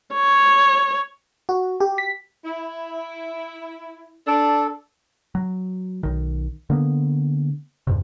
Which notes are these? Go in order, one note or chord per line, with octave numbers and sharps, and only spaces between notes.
C#5
F#4
G4
B6
E4
D4 A4
F#3
B1 D#3
D3 A#3 B3
E2 G2 C3